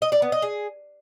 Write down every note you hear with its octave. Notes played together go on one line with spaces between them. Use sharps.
D#5
D5
B3
D#5
G#4